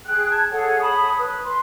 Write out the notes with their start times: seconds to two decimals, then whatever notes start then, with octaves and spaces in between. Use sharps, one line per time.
0.06 G#4 G5 F#6
0.30 A5 G#6
0.51 G#4 A4 C#5 F#5
0.79 C#5 A5 B5 D#6
1.17 B4
1.44 C6